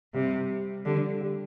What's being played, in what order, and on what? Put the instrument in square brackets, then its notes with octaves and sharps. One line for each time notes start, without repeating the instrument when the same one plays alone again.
[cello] C3 [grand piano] G3
[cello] D3 [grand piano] G3
[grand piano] G3